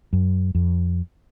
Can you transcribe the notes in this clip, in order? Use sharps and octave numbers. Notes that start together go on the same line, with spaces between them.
F#2
F2